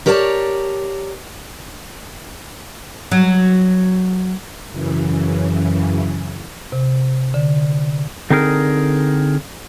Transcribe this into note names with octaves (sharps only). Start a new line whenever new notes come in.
G4 A#4 C#5 D5 G#5 A5
F#3
F#2 C#3 E3
C3
D3
D3 C4 D#4 G#4 A#4